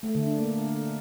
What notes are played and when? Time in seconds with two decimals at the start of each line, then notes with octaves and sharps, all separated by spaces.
0.03 A3
0.15 D3
0.27 D4
0.39 A#3